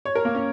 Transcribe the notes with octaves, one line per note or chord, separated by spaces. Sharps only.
C#5
A#4
A#3
C#4